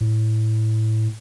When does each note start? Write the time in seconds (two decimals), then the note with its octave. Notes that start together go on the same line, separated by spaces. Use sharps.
0.01 A2